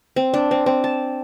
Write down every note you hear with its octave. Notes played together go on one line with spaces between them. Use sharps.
C4
D4
C4
C4
A5